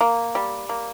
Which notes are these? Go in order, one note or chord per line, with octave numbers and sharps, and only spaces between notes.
A#3
G3
A#3